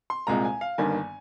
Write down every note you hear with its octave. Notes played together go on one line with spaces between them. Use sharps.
C6
C2 A#2 G#3 C4 A#5
G#5
F5
G1 G2 D#3 A#3 G#5